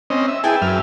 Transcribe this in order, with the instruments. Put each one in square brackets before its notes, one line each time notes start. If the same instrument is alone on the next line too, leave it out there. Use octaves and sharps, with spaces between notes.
[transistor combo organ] C4 C#4 D#5
E5
[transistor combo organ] E4 G#4 [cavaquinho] B4 G5 A5
[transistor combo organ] F#2 E5 F6